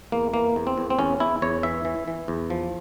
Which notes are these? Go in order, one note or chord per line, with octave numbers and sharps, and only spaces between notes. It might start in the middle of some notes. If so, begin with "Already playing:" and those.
E2 A#3
E3 A#3
E2
C4
E2
C4
E2 C#4
E2 E4
E2 C#5
E3 E5
E3
E3
E2
F3